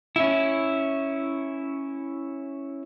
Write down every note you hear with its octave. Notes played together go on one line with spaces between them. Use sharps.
C#4 E4